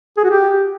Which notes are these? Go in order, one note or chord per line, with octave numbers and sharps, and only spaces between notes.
G#4
F#4
G4